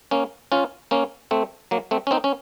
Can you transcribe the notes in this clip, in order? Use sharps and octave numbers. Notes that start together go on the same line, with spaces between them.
A#3 C#4
C#4 F4
A#3 C#4
A3 C4
F#3 A#3
A3 C4
C#4
C4 D#4
C#4